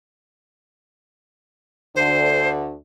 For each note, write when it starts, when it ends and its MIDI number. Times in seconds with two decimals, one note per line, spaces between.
1.96 2.74 38
1.96 2.74 50
1.96 2.49 72